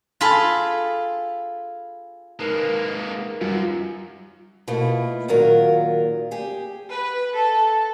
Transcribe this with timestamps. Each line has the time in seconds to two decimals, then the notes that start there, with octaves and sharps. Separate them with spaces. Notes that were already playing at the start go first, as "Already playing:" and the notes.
0.21 F4 G#4 A4 B5
2.40 G#3 A#3 D#4 A#4 B4
3.41 F#2 G3 F4
4.68 B2 A3 A#3 E4 F4
5.28 A#2 D#3 F#3 F4 A#4
6.31 G4 G#4
6.90 B4
7.34 A4